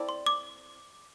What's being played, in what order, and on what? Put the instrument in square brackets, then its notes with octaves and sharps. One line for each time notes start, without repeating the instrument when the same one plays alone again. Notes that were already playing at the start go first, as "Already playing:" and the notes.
Already playing: [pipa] C4 E4 A4 D5
[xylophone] C6
D6